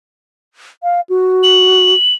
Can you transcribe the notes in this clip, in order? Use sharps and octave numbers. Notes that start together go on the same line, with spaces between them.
F5
F#4
F#7